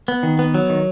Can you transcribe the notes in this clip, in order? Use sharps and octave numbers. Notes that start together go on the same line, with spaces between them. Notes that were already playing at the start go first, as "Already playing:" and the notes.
B3
D#3
B3
F#3
D#3